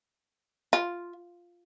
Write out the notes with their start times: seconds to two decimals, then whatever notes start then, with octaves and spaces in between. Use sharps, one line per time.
0.73 F4